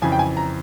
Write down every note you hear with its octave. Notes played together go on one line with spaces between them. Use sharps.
F2 C#3 E3 G#5
G5
G#5
A#5